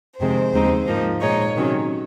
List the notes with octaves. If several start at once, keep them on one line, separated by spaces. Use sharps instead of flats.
F2 C3 D#3 G#3 C4 C5
D#2 C#3 G#3 C4 D#4
G#2 F3 A#3 D#4
A#2 G#3 D#4 C#5
C3 D#3 F#3 C#4